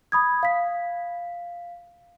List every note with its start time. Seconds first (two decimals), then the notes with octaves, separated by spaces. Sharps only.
0.12 B5 D#6 G#6
0.43 F5 B6